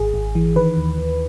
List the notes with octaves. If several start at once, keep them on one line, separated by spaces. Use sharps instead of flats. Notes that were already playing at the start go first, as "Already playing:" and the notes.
Already playing: G#1 G#4
G#1
E3
D#3 B4
D#2
D#2